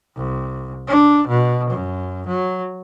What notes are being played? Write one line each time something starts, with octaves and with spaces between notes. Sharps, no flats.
C2
D4
B2
F#2
F#3